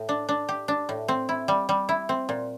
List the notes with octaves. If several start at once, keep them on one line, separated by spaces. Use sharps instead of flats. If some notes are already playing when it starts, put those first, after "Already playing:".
Already playing: A2
D4
D4
G4
D4
A2
C4
E4
G3
G3
E4
C4
A#2